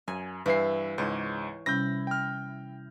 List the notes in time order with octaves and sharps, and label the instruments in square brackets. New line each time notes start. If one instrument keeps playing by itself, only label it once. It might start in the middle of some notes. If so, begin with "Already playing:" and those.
[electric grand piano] F#2 [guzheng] G#5
[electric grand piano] G2 E5 C7 [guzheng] E3
[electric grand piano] C#2 G#2 [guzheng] C#5
[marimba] C3 G3 C#4 [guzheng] E4 [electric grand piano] G6 A#6
[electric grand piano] G5 F6